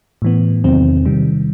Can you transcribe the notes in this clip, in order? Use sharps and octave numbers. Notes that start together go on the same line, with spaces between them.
A2 E3 B3
E2 C3 D#3 F#3 C4
C3 D#3 G3